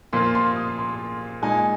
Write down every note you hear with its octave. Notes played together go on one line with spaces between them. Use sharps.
A#2 F3 A#3 F4 C6
C6
D#6
C6
A#2 G#3 D#4 G#5